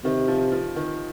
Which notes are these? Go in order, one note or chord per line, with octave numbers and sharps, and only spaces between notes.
C3 D#3
F3
F3
D#3